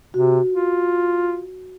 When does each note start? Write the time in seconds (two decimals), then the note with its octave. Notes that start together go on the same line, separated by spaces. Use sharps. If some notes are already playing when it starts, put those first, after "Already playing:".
0.14 C3 F#4
0.53 F4